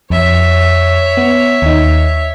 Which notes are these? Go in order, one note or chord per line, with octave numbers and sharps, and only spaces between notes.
F2 C#5 E5
B3
D#2 D#4